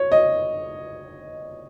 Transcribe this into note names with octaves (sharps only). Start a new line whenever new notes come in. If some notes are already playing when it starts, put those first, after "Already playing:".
Already playing: C#5
D#5